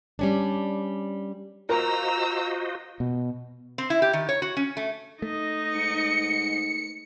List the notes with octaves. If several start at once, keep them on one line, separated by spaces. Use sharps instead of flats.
G3 C#4 D4
F4 F#4 A#4 C5 D#5 A#5 E6
B2
C4
E4
G4
D#3
C#5
F#4
C#4
A3
A3 D#4 D#5
G#2 C#7